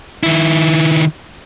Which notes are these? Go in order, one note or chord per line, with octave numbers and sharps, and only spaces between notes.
D#3 E4